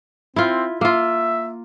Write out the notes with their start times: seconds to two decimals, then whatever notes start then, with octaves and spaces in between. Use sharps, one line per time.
0.36 C4 E4 F4
0.81 A#3 F4 E5